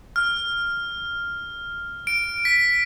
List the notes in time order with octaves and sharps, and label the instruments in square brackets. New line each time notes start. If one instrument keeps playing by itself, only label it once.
[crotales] F6
D7
B6